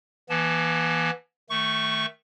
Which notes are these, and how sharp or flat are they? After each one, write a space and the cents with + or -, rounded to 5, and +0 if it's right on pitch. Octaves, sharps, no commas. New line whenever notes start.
E3 +5 B3 -45 A5 -20
D#3 +0 A3 +0 C#6 +5